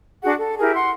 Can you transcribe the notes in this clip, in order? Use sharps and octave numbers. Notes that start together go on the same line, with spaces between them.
D4 F#4 G#4 F#5
A4
E4 G4 G#4 A#4
F#5 C6